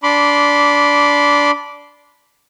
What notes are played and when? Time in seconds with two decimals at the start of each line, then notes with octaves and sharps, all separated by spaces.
0.03 D4 B5 C6 D6